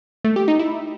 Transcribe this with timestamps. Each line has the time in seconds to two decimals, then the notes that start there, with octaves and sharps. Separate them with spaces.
0.24 A3
0.36 G4
0.48 D#4
0.59 E4